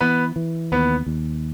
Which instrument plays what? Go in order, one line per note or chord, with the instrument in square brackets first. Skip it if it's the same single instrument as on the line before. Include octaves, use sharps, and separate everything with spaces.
[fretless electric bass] E3 [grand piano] B3 B4
[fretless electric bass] E3
[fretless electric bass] D#2 [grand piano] B3 B4
[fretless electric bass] D#2